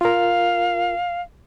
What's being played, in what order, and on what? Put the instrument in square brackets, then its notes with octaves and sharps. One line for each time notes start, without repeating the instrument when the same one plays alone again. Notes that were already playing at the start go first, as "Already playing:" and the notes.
[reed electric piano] F4 A#4 [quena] F5